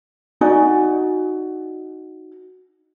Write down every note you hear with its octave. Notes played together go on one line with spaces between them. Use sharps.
D#4 F#4 D5 G#5